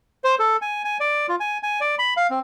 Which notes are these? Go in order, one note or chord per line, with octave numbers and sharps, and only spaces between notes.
C5
A4
G#5
G#5
D5
F4
G#5
G#5
D5
B5
F5
C4